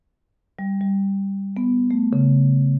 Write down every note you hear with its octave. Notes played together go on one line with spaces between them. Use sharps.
G3
G3
B3
A3
C#3